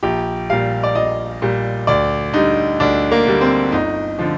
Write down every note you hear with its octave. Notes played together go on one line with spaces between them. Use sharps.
A#1 G4
A#2 G3 F5
D5
A#1 D#5
A#2 G3
D2 D5
D3 G3 D#4
D2 D4
A#3
D3 G3
C4
G1 D#4
D3 F3